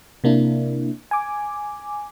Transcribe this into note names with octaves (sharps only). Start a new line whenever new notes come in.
C3 A#3 D4 E4
G#5 D6